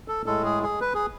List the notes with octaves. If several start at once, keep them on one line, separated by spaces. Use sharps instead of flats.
A4
A2 G#3 A4
G#4
G#4
B4
G#4